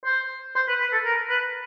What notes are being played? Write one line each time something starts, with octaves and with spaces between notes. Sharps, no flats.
C5
C5
B4
B4
A4
A#4
B4